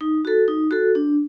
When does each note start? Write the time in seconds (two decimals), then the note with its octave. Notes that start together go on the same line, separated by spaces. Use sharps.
0.01 D#4
0.25 F#4 A4
0.48 D#4
0.71 F#4 A4
0.95 D4